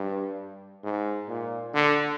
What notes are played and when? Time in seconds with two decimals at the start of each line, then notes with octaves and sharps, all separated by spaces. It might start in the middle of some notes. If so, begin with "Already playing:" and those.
Already playing: G2
0.84 G#2
1.28 A#2
1.74 D3